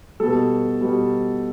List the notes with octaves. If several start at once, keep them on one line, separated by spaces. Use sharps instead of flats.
B2 G3 A4
B2 G3